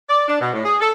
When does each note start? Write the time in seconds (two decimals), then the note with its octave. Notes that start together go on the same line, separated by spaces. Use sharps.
0.10 D5
0.28 D4
0.41 B2
0.53 A2
0.65 G#4
0.81 A4